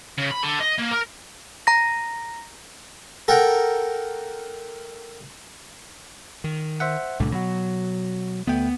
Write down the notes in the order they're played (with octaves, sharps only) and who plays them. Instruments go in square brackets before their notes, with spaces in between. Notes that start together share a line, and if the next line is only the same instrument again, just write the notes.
[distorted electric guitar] C#3
B5
D3
D#5
A#3
A#4
[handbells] A#5 A#6
[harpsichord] A4 A#4 F#5 G5
[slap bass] D#3
[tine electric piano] C5 E5 F#5
[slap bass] C2 A2 G3 [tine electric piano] D3
[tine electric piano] B2 F#4 [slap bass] F#3
[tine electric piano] D2 A3 G5 [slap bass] B3